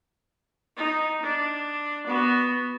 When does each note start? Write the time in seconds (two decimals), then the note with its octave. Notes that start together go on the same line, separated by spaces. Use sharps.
0.77 D#4
1.24 D4
2.07 B3 F#4